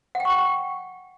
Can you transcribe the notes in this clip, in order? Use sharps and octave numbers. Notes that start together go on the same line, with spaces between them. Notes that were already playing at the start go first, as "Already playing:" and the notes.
F#5
G5
C#6
G5